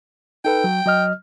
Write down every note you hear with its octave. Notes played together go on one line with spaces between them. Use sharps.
D#4 A4 B4 G5
F#3
F#3 D#5 F6